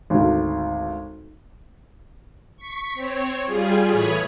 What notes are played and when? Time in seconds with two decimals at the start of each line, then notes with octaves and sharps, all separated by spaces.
0.10 G#1 D2
2.57 C#6 B6
2.94 C4 C#5
3.45 G3 F4 G#4
3.91 A2 E3 C#5 B5 D#6 G#6